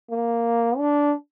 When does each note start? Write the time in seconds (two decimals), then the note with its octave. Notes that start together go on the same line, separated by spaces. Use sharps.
0.11 A#3
0.78 D4